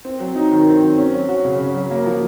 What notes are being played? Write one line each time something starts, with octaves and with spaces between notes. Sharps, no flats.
C4
F#3
D#4
D#3
C4
F#3
C#4
F#3
F#4
C#3
C#4
F#3
A#3
F3